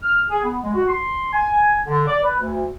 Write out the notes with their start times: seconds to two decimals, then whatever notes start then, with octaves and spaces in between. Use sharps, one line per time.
0.03 F6
0.29 G#4
0.42 B3
0.62 G#3
0.74 F#4
0.88 C6
1.33 G#5
1.86 D3
2.07 D5
2.23 B4
2.40 D2